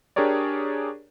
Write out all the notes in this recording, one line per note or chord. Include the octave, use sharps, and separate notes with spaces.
D4 G4 G#4 A#4 C#5 D5